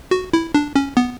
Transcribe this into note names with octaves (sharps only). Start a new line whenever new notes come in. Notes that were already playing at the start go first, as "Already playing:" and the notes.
F#4
E4
D4
C#4
B3